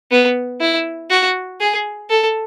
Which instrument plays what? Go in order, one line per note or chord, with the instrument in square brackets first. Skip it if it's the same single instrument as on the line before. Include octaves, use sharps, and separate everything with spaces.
[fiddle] B3
E4
F#4
G#4
A4